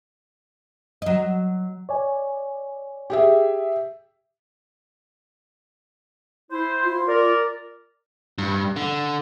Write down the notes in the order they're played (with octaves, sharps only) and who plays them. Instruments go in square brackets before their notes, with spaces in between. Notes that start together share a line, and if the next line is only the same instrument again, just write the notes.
[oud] F#3 D#5
[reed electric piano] C#5 D5 G#5
[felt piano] G4 G#4 E5
[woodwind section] E4 C5
[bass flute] F4
[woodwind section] A#4 D5
[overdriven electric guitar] G2
D3